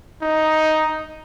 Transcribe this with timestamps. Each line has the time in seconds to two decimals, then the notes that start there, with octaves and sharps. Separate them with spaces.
0.22 D#4